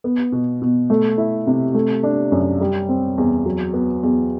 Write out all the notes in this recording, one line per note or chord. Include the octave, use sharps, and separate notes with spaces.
B3
B2
B2
A3
E4
C3
A3
D4
F#2
G3
C4
E2
F#3
B3
E2